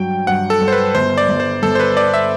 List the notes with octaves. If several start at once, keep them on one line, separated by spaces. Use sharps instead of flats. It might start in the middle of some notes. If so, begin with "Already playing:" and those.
Already playing: G2 F#3 G5
G2 F#5
A4
G2
C5
B4
G1 C5
D5
G1
C5
G1 A4
C5
B4
B3 D5
E5